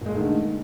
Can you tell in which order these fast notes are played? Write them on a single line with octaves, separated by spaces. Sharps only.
A#2 G#3 A3 D#3 D3